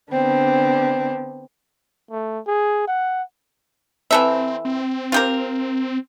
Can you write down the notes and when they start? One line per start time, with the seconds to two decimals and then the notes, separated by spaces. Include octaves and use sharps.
0.12 D3 B3 C4 D4
2.11 A3
2.47 G#4
2.87 F#5
4.11 E3 C4 A4 E5
4.65 C4
5.12 F4 G4 A#4